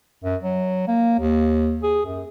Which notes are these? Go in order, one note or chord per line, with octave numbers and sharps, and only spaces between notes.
F#2
F#3
A#3
D#2
G#4
F#2